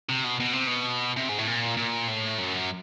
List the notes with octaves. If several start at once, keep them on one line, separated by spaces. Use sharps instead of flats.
C3
B2
B2
C3
B2
C3
G#2
A2
A#2
A#2
A2
F#2